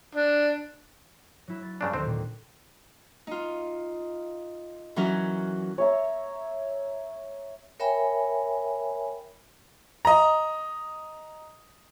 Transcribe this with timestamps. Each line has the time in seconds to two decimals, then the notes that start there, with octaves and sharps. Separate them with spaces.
0.15 D4
1.48 F#3 E4
1.63 A6
1.81 G2 C#3 D4
1.93 D#2 D3 D#3 C4 C5
2.06 A#2
3.27 D#4 F4
4.96 E3 F#3 C#4 E4 F#4 A#4
5.78 C#5 E5 A#5
7.80 A#4 C#5 E5 G5 G#5 B5
10.05 D#5 A#5